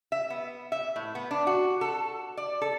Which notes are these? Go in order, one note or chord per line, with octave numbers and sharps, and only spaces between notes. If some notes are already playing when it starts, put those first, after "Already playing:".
E5
B3
E5
A2
B3
D4
F#4
A4
D5
A4